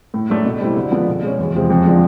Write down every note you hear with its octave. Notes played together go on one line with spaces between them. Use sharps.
A2
F#3 A3 D4
B2
G3 C4 E4
D3
F3 G#3 B3 D4
B2
G#3 C#4
E2
C3 F3 G#3 C4
F2
D3 F3 G#3